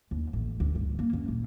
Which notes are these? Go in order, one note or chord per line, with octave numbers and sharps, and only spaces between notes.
D#2
A1
D2
G2
A#3
F#2
A#2